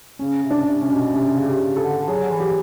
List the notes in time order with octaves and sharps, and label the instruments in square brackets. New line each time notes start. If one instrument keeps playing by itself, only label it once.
[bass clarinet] C#3 [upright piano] C#4
[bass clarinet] C3
[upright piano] D4
[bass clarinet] C3
[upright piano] C#4
[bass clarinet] B2
[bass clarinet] C3 [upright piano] C#4
[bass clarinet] C#3
[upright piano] G4
[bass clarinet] C#3
[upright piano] A4
[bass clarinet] D3
[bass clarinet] F#3 [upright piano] G#4
[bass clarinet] E3
[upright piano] G4